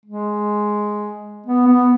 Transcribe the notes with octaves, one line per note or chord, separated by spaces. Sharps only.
G#3
B3
B3